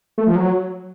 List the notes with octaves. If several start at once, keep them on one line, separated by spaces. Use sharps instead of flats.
A3
F3
F#3